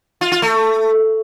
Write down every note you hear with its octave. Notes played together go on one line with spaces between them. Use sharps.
F4
F4
A3